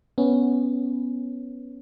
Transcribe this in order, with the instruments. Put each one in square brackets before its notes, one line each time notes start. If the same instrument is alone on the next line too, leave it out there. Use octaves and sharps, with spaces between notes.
[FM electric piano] B3 C#4